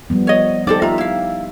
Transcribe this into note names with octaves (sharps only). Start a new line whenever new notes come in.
F3 G3 B3
C#5 D#5
D#4 G4 A4 C5 D5
F4 E5 A#5
E4 F5